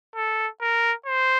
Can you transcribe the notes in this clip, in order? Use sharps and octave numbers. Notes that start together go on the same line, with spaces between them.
A4
A#4
C5